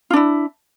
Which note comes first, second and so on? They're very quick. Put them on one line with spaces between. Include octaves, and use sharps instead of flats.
F4 D4 E4